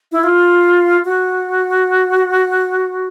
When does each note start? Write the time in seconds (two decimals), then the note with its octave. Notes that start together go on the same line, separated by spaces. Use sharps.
0.12 E4
0.23 F4
1.05 F#4